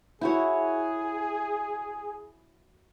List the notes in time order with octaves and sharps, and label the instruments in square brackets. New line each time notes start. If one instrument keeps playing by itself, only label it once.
[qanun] E4 F#4 C#5 [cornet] G#4